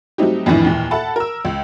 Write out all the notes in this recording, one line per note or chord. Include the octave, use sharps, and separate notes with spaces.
F#3 G3 A3 C4 D#4 G4
F2 A2 D#3 E3 D4 E4
D#2 A#2 E3
A4 E5 F#5 A5 B5
A#4 E6
C#2